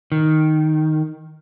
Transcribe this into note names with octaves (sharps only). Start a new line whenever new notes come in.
D#3